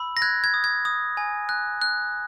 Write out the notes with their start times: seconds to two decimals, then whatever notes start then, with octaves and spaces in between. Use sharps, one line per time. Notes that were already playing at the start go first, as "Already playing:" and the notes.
Already playing: B5 E6
0.17 A#6
0.22 F#6 G#6
0.44 G#6
0.54 D#6
0.64 G#6
0.85 D#6
1.17 G#5
1.49 F#6
1.82 F#6